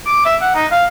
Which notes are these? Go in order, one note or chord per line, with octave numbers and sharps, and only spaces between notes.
D6
E5
F#5
D#4
F5